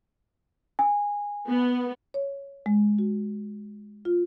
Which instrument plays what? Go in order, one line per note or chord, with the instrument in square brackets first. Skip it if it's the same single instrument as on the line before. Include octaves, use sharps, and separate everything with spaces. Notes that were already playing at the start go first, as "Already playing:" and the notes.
[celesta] G#5
[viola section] B3
[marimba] C#5
G#3
F#4
F4